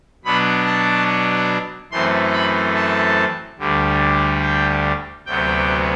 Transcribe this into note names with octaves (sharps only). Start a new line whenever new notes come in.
B2 F#3 B3 D4 B5
A5
F#2 E3 A3 C4 C6
B5
A5
D2 D3 G3
G5
D2 C3 F#3 B3 G5